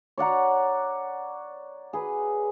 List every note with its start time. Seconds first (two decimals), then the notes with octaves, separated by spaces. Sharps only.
0.18 C#5 D5 F#5 A#5
1.93 G#4 B4